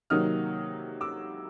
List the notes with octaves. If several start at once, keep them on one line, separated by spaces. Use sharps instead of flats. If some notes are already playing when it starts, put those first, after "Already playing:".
C3 D#3 F#3 A#3 D#4 D#6 F6
D6 E6